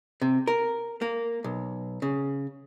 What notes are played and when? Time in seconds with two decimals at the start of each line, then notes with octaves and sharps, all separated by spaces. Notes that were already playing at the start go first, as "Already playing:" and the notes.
0.22 C3
0.47 A#4
1.02 A#3
1.44 B1
2.02 C#3